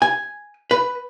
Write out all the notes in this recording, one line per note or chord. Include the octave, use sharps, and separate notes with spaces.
G#5
B4